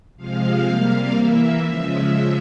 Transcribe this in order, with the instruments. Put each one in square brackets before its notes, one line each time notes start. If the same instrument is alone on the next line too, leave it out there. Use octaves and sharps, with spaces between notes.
[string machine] C3 F3 G#3 F5
C3 G3 A#3
E3 A#3 E5
C#3 F3 G#3